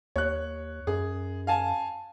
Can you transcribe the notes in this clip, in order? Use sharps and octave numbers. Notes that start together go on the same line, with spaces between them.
D#2 C#5 F#6
F#2 G#4
F5 G#5 A5